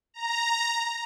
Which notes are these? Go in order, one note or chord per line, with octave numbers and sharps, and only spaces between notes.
A#5